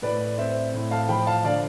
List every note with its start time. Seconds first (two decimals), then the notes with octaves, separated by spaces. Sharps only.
0.02 A2 B4 D5
0.38 C4 C5 E5
0.74 A2
0.91 F5 A5
1.09 F3 G5 B5
1.27 F5 A5
1.45 D3 D5 F5